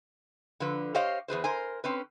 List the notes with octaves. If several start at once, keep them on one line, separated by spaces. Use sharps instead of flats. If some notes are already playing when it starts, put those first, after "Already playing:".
D3 F3 B4
G4 C5 C#5 D#5 F5
E2 G#4 B4 C5
A#4 C5 G#5
C4 C#4 B4